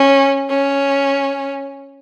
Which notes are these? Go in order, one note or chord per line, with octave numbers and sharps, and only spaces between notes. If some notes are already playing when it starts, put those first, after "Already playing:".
Already playing: C#4
C#4